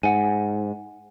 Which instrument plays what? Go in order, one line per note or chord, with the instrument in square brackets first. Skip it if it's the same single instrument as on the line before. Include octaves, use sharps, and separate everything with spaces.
[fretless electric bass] G#2 [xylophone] F#5 G#5